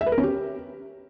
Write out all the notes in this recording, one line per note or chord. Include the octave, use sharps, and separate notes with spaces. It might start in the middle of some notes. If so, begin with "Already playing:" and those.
E5
B4
A#4
C#4
G4